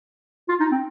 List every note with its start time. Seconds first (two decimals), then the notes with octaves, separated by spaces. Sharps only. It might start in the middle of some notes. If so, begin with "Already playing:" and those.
0.49 F4
0.60 D#4
0.71 C4